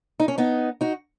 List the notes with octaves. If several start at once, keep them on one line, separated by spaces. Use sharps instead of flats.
D#4
C#4
B3 D#4
D#4 F#4